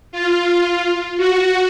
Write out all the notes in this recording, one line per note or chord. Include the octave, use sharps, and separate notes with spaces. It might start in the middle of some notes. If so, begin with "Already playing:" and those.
F4
F#4